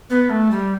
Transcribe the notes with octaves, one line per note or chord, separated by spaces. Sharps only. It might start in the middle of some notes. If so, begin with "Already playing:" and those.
B3
A3
G3